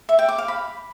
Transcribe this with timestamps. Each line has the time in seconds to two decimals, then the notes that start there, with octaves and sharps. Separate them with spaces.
0.09 E5
0.19 G5
0.29 D6
0.38 F5
0.48 B5